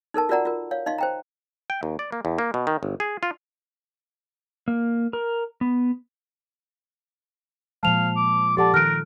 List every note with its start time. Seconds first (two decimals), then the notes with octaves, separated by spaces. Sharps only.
0.14 D#4 A4 A#4 A5
0.29 F4 F#4 A#4 D5 F#5 A#5
0.45 F4 A#4
0.71 C#5 F5
0.86 D#4 D#5 F5 C6
0.98 C5 G5 A#5
1.70 G5
1.83 D#2
1.99 D5
2.12 A#3
2.25 E2
2.38 A#3
2.54 B2
2.67 D#3
2.83 G1
3.00 G#4
3.23 F4
4.68 A#3
5.13 A#4
5.61 B3
7.83 A#2 F3 G#3 F5 A5 F7
8.16 D6
8.57 F3 G4 A4 D5 F#5 A5
8.74 D#3 A#4 F6 F#6 D7